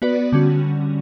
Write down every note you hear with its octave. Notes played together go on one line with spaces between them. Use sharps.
B3 F#4 B4 D5
D3 G3 C#4 F#4